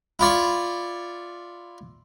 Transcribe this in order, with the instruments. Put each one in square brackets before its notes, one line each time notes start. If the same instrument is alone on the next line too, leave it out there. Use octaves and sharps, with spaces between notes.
[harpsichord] E4 F4 D5 C#6